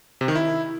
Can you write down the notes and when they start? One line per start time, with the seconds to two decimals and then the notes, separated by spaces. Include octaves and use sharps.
0.21 C3
0.28 D#3
0.35 E4